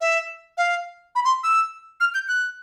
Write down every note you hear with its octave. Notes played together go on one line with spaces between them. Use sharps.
E5
F5
B5
C6
E6
F6
G6
F#6